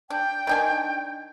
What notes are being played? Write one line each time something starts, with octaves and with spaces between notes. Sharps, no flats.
D4 G5
D#3 D4 G#5